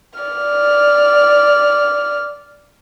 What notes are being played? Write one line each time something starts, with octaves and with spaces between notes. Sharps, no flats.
D5 F6